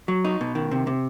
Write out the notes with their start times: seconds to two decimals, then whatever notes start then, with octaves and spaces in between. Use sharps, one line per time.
0.08 F#3
0.25 D#4
0.41 B2
0.55 D#3
0.71 C3
0.87 C3